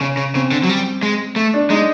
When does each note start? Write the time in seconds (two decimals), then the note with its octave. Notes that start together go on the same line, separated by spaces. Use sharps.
0.01 C#3 C#4
0.17 C#3
0.34 C#3 C4
0.52 D3
0.63 F#3
0.69 G3
1.03 G#3
1.36 A3
1.54 D4
1.70 G#3 D#4